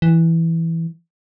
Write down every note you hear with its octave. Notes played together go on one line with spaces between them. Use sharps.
E3